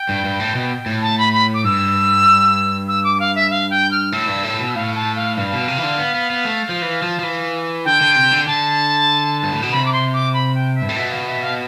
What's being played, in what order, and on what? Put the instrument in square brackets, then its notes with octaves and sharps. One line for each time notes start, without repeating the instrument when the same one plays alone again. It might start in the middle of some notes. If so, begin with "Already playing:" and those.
Already playing: [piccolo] G5
[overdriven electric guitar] G2
G2
A2
B2
A2
[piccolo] A5
B5
B5
D6
[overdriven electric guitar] G2 [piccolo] E6
[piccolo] E6
D6
F5
E5
F5
G5
F6
[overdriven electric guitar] A2 [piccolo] E6
[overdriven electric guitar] G2
A2
B2
[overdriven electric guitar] A2 [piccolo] F5
[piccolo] A5
F5
[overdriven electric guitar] G2 [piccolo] F5
[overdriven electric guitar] B2
C3
E3
D3
B3
B3
B3
A3
F3
E3
F3
F3
E3
[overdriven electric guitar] D3 [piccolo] G5
[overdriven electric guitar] D3
C3
D3
[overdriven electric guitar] D3 [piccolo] A5
[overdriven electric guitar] G2
A2
B2
[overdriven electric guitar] C3 [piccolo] B5
[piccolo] D6
C6
D6
B5
G5
E5
[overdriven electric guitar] G2
A2
[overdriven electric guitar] B2 [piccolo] E5
[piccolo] F5
E5
F5